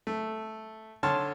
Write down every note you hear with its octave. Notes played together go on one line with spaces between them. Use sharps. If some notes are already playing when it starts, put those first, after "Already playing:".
A3
D3 C#5 A5 C6 F6